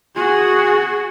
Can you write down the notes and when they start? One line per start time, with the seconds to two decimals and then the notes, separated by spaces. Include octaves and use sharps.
0.15 F#4 G#4